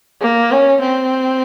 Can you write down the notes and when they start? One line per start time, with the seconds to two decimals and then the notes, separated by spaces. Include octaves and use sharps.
0.22 A#3
0.52 C#4
0.82 C4